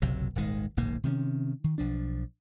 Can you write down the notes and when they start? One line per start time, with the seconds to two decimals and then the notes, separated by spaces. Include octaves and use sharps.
0.02 F#1 B1 C3 F#3
0.35 D#1 G#1 D#3 G#3
0.77 D1 A#1 G#2 A#3
1.04 C3 D#3 G3 C#4
1.64 D#3
1.78 B1 F3 D4